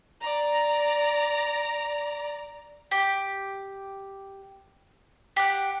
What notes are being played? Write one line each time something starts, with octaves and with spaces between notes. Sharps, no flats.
D5 A#5
G4
G4 F#5